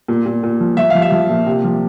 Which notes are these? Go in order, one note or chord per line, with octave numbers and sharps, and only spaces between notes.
A#2
A#2
A#2
F3
F3 E5
F3 F5
E5
F3
A#2
C3
F3